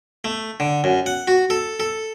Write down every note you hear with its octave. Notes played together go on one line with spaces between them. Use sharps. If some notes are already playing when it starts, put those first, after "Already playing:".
A3
D3
F#2
F#5
F#4
A4
A4